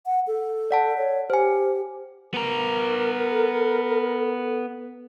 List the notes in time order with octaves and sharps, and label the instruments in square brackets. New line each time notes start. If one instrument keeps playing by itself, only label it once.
[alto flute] F#5
A4
[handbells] D5 F#5 A5
[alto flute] C#5
[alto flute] G4 [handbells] C5 G#5
[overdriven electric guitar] B3 A#5 [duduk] A#4
[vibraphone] A4